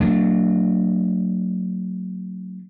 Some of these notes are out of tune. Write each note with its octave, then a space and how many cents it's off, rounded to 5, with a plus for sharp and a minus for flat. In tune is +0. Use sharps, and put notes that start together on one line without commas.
F#3 +0 A#3 -45 D4 +0